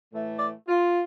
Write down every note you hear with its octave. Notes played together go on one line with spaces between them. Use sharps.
A2 E3 A3
D5
F4